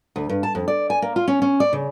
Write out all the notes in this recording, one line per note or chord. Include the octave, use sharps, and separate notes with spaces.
D2
G2
A5
F2
D5
G#5
A#3
F4
C#4
C#4
D5
C#3